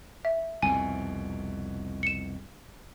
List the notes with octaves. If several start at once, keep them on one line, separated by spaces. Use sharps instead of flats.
E5
C2 F2 B2 G#5
C#7 E7